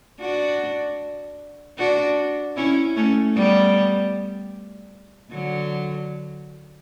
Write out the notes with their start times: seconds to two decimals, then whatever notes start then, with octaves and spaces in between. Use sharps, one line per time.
0.21 D4 F#4
1.78 D4 F#4
2.56 C#4 E4
2.96 A3 C#4
3.35 G3 B3
5.32 D3 F#3